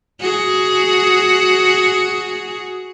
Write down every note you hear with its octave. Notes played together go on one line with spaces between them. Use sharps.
F#4 G#4